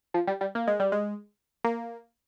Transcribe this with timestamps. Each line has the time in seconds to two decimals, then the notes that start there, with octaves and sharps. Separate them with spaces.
0.14 F3
0.27 G3
0.41 G3
0.55 A#3
0.67 G#3
0.80 G3
0.92 G#3
1.64 A#3